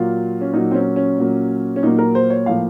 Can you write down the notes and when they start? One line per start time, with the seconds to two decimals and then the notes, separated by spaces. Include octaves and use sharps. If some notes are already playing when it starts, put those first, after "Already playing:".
Already playing: A#2 F#3 A#3 F4
0.41 C#4
0.53 A#2 F#3 A#3 D#4
0.71 C4
0.75 C#4
0.96 C#4
1.18 A#2 F#3 A#3
1.76 C#4
1.83 A#2 F#3 A#3 D#4
1.98 A#4
2.15 C5
2.30 C#5
2.46 A2 F3 A#3 F5